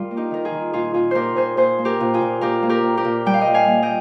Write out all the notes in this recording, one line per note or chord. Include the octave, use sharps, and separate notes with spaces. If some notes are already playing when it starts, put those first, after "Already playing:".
Already playing: G3 F4 A#4
A#3
D#4 G4
D#3 A#4
F4 G#4
D#3
A#2 F4 G#4
A#2 F4 G#4
A#2 G4 A#4 C5
A#2 G#4 C5
A#2 G#4 C5
A#3
G4 A#4
A#2
F4 G#4
A#2
A#2 G4 A#4
A#3
G4 A#4
A#2
G4 A#4
A#2
G3 G5
F5
D#5 G5
A#2
F5 G#5
A#3
D#5 G5